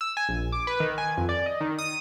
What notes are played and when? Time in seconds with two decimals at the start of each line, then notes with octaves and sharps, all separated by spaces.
0.01 E6
0.17 G#5
0.29 A#1
0.52 D6
0.67 B4
0.80 D#3
0.98 G#5
1.18 F2
1.29 D5
1.46 D#5
1.61 D#3
1.79 D#6